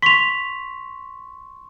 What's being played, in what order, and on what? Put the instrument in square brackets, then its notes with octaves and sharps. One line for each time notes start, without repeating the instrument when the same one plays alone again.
[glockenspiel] C6 C#6 [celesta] B6 F7